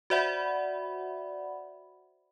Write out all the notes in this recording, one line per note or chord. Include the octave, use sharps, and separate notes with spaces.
F#4 C5 D5 E5 F#5 B5